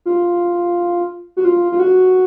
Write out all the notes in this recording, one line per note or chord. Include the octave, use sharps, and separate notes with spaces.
F4
F#4
F4
F4
F#4